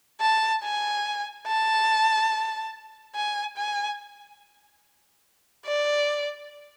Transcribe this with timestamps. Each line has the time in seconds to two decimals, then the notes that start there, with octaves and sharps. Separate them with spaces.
0.21 A5
0.63 G#5
1.47 A5
3.15 G#5
3.57 G#5
5.66 D5